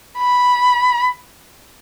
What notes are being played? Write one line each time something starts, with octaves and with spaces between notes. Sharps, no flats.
B5